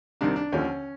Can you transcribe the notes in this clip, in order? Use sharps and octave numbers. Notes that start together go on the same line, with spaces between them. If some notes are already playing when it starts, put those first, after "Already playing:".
C2 C3 D#3 D4
D4
D#2 D3 F3 C#4